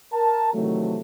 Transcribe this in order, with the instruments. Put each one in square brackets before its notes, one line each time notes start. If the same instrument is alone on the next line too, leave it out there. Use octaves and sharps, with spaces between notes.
[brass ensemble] A#4 A5
C3 D#3 E3 F#3 A3